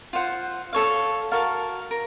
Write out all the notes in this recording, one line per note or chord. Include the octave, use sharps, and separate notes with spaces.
F4 C5 F#5
A4 C#5 F5
F#4 A#4 F5 A5
A#4